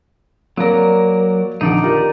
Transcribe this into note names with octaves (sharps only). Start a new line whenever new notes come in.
F#3 A#3 A#4 D5
A#1 D3 D#3 D#4 D5
F4 G4 A#4